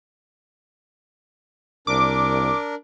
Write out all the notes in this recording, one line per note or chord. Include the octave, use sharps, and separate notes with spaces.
C2 D4 A#4 D6